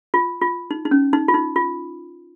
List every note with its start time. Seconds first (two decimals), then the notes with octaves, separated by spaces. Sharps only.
0.14 F4
0.41 F4
0.71 D#4
0.85 D#4
0.91 C#4
1.13 D#4
1.28 F4
1.34 D#4
1.56 F4